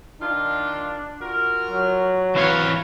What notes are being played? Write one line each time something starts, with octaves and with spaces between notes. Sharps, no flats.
D#3 D4 F4
F4 F#4 A#4
F#3
E3 C4 B4 C#5 F5